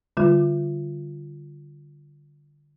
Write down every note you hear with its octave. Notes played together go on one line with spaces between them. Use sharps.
D3 G3 F4